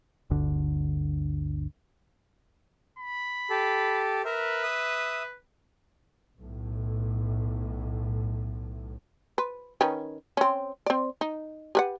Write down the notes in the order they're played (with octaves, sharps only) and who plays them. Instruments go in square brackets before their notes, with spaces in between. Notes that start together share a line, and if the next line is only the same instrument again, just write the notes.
[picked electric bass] G1 D2 D3
[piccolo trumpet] B5
[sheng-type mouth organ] G4 A4
[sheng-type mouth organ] A#4 E5 [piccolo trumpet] B4
[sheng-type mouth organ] E5 D#6
[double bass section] B1 A2
[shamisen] B4
D#3 C#4 B4
C4 C#4
C4 D5
D#4
G4 B4 F#5